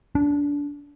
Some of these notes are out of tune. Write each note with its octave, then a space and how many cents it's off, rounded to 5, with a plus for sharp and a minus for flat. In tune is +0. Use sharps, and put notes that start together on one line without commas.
D4 -25